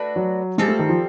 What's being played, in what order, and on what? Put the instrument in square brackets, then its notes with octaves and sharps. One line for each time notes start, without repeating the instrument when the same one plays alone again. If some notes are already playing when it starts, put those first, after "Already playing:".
Already playing: [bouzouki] A3 D4 F#4 B4
[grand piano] F#3
[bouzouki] G3 C4 F4 A4 [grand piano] G#3
[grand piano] A3
D#3
F3